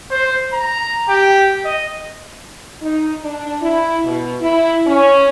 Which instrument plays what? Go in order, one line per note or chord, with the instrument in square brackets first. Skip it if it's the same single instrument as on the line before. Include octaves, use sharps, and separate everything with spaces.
[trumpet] C5
A#5
G4
D#5
[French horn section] D#4
D4
E4
B2
E4
C#4